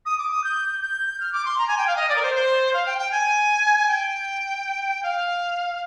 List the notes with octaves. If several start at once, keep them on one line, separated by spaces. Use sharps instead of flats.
D#6
D6
D#6
G6
G6
F6
D6
C6
A#5
G#5
G5
F5
D#5
D5
A#4
C5
C5
F5
G5
G5
G#5
G5
F5